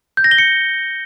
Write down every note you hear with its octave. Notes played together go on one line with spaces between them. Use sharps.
G6
A#6
G7
C#7